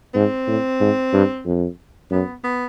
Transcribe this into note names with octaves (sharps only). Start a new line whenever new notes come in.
G#2 C4
A2
G#2
G2
F2
F#2 B3
B3